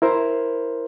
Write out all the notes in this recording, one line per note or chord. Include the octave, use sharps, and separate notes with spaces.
E4 A#4 C5